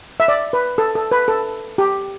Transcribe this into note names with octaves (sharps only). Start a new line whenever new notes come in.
E5
D5
B4
A4
A4
B4
A4
G4